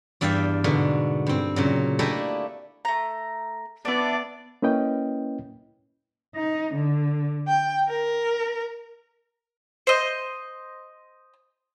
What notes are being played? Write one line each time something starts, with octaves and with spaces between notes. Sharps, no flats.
E2 G2 D5 E5 F5 G5
G#2 B2 D3
G2 C4
A#2 C#3 F#3
A3 A#3 D4 E4 G4 D#5
A3 A#5
B3 D4 E4 D5
A#3 C#4 E4 B4 D#5 G5
D#4
D3
G5
A#4
C5 D#5